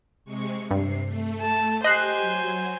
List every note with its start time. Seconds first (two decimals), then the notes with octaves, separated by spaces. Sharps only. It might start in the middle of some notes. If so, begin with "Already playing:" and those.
0.25 C3 G#3 C#6
0.71 G2 C3 C7
1.05 A3
1.41 A5
1.84 G4 C5 D#5 G#5 F#6 C7
2.21 F#3